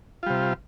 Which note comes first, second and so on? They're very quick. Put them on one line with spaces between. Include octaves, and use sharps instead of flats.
F4 G3 C3